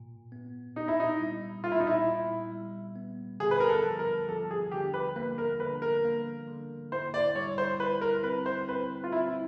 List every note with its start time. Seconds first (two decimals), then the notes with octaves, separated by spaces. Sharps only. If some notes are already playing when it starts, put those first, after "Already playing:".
Already playing: A#2
0.32 B3
0.76 A#2 D#4
0.88 E4
1.00 D#4
1.20 G3
1.64 A#2 F4
1.72 E4
1.80 D#4
1.87 E4
2.08 A#2
2.52 G3
2.96 B3
3.40 D3 G#4
3.51 B4
3.60 A#4
3.69 A4
3.84 F3
3.99 A#4
4.28 F3 A4
4.51 G#4
4.72 D3 G4
4.94 B4
5.16 A#3 B4
5.38 A#4
5.59 D3 B4
5.82 A#4
6.05 A#3
6.48 D3
6.92 E4 C5
7.14 D5
7.35 G3 C#5
7.58 C5
7.80 E4 B4
8.01 A#4
8.23 C4 B4
8.46 C5
8.68 C4 B4
9.04 F4
9.12 C4 E4